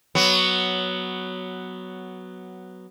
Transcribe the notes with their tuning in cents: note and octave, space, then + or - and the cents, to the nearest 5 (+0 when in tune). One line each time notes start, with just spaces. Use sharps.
F#3 +5 B3 +0